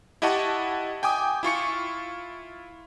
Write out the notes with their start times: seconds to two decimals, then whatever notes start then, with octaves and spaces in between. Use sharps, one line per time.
0.22 E4 G4 D#5 F#5 A5 C#6
1.03 G5 G#5 D6 D#6
1.43 E4 F4 C#6 C#7